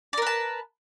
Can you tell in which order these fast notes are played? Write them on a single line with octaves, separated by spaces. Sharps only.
D5 A#4 B4 A5